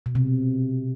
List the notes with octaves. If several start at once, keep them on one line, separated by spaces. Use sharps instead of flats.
B2
C3